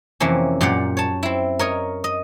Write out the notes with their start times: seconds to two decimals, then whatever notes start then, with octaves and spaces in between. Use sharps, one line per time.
0.20 F2 C3 E3 A#3 C#4
0.61 F#2 A#2 G4 D5 F5 F#5
0.97 C#5 A5
1.23 C4 E4
1.59 A#4 C#5 D#5
2.04 D#5